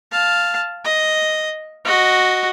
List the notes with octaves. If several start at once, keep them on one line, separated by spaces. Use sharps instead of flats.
F5 A5
D#5
F#4 D#5